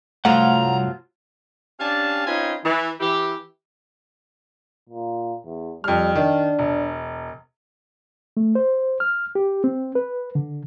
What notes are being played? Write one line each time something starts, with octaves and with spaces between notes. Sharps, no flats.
C2 G2 F3 F#3 A3 F4 F#5 A#5
C#4 D4 G4 F5 G#5 A5
C4 C#4 D#4 F4 B4 G#5
E3
E3 E4 G4
A#2
E2
F2 G3 F6
D#3 D4
E1
A3
C5
F6
G4
C4
B4
D3